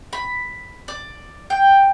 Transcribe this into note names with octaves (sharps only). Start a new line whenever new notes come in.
B5
D5
G5